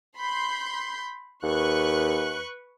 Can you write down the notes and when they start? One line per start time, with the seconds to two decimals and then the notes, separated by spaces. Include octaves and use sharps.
0.17 B5 C6 G6
1.43 D#2 B4 C#6 F#6